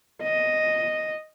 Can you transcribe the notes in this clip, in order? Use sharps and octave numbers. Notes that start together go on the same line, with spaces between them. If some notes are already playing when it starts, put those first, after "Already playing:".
D#5